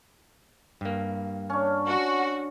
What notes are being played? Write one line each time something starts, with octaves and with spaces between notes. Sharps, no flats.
G2 A#3
C#4 D4
F#4